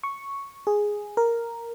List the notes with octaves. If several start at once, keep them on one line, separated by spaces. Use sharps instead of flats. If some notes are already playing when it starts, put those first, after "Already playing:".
C#6
G#4
A#4